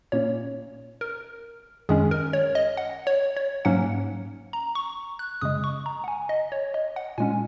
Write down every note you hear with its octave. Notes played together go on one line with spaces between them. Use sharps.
A#2 A#3 C#4 C#5
A#4
F#2 D#3 G#3 C#4 G#4
A#4
C#5
D#5
F#5
C#5
C#5
G#2 F#3 A#3 C#4 F#5
A#5
C#6
F#6
F#2 C#3 G#3 D#6
C#6
A#5
F#5
G#5
D#5
C#5
D#5
F#5
A#2 G#3 C#4 G#5